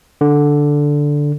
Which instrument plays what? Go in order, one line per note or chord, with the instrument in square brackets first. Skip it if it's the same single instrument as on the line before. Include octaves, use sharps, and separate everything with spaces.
[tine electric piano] D3